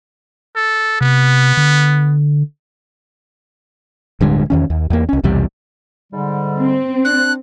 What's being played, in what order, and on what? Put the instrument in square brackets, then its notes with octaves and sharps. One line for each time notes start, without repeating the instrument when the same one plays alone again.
[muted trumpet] A4
[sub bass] C3 [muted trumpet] B3
[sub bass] D3
[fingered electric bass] D1 G2 D3 G#3
E2 D#3 C#4
D#2
E2 A#3
C2 C#4
B1 E2 C3 G3
[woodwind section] G#2 D3 G3
[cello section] C4
[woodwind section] D4 [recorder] F#6